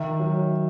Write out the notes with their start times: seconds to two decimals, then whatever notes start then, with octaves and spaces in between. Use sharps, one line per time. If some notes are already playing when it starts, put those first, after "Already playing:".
Already playing: D#3 E5
0.19 F#3